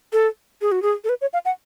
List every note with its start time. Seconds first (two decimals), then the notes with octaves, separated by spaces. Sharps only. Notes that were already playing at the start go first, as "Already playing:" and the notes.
0.13 A4
0.62 G#4
0.72 F#4
0.82 G#4
1.04 A4
1.09 B4
1.21 C#5
1.33 F5
1.45 F#5